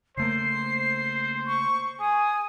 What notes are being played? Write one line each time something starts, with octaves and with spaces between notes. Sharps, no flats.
C#3 A3 A#3 C5 C7
C#6
G#4 G#5 D#6